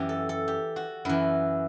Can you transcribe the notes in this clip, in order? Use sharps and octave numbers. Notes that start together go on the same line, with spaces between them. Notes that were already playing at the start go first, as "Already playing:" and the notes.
Already playing: F#2 E3 G4
A4
A4
G4
F#4
F#2 E3 E4